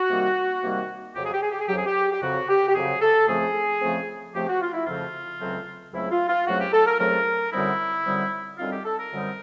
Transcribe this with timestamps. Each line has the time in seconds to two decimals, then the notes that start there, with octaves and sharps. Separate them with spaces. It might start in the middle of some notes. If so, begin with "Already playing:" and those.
Already playing: F#4
0.10 C3 D#3 G3 A#3
0.62 C3 D#3 G3 A#3
1.16 F2 C#3 F#3 G4
1.25 G#4
1.34 G4
1.42 G#4
1.51 G4
1.60 G#4
1.69 F2 C#3 F#3 G4
1.78 G#4
1.86 G4
2.12 G4
2.22 F2 C#3 F#3 F#4
2.49 G4
2.68 G4
2.75 F2 C#3 F#3 G#4
3.02 A4
3.28 F2 C#3 F3 A3 C4 G#4
3.81 F2 C#3 F3 A3 C4
4.34 F2 C#3 F3 A3 C4 G4
4.48 F#4
4.61 F4
4.74 E4
4.87 F2 C#3 F3 A3 C4 F4
5.41 C#2 C#3 F#3 A3 C4
5.93 C#2 C#3 F#3 A3 C4 E4
6.11 F4
6.29 F4
6.47 C#2 C#3 F#3 A3 C4 F#4
6.60 G4
6.73 A4
6.87 A#4
7.00 C#2 C#3 F#3 A3 C4 A#4
7.53 F#2 D3 G3 C4 D#4 E4
8.05 F#2 D3 G3 C4 D#4
8.59 F#2 D3 G3 C4 D#4 F4
8.72 G4
8.86 A4
8.99 A#4
9.12 F#2 D3 G3 C4 D#4